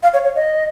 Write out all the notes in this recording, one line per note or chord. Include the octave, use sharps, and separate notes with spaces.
F5
C#5
C#5
D#5